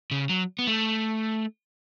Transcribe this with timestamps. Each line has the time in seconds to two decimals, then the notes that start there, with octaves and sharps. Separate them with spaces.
0.11 C#3
0.29 F#3
0.59 B3
0.67 A3